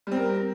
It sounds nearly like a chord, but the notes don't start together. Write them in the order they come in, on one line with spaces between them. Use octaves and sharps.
G3 C4 A#4